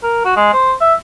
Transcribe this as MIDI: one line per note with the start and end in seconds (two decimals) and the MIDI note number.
0.03 0.25 70
0.25 0.32 66
0.36 0.52 56
0.53 0.73 72
0.81 0.94 76